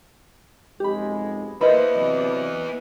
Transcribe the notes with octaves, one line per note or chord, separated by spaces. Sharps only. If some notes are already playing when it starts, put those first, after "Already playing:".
B1 F2 G#3 G4 B5
A#3 B3 E4 B4 C5 D#5 B5
C3 F#3 D5